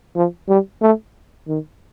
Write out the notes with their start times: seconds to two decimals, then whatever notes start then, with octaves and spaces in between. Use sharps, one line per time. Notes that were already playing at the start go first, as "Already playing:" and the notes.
0.16 F3
0.48 G3
0.81 A3
1.48 D#3